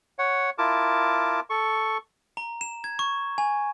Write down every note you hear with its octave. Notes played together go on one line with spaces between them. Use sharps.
C#5 F#5
E4 F4 A#4 A5 D6
A4 C#6
A#5
E7
G#6
C#6
G#5